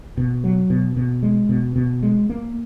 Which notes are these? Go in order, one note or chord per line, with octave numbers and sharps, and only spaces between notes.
B2
F#3
B2
B2
G#3
B2
B2
G#3
A#3